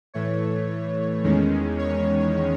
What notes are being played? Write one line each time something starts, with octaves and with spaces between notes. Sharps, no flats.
A2 E3 A3 C#5
E2 D#3 G#3 C#4
C#5